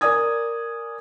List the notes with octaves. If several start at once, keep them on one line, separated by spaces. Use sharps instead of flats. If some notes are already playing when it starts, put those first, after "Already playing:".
A#4 D5 G#5 D#6 G#6